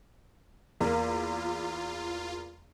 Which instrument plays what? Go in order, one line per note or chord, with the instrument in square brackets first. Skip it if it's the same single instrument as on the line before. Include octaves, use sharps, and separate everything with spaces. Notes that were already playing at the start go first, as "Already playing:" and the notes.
[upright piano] E2 A#3 [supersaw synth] F4